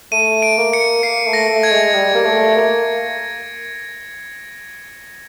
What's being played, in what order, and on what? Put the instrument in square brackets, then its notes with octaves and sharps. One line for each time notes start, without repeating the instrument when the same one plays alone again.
[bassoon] A3 [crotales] D#7
[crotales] D7
[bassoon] A#3
[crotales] C#7
[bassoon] A#3 [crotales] C7
[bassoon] A3
[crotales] A#6
[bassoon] A3
[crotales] G#6
[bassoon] G#3
G3
A#3
A3
A#3